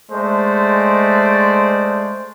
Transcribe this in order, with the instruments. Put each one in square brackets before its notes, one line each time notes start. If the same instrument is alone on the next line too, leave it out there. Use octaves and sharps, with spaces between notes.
[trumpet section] G#3 A3 C5 D5